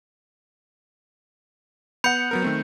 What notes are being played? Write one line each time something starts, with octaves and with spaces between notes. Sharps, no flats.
B3 F#5 B5 G6 C#7
F#3 B3 A#4
D#3 A3 C4